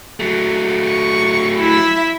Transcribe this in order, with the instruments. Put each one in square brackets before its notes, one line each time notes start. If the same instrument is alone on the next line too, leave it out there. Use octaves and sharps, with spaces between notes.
[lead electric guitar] F#3 A3
[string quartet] C#6
E4 E5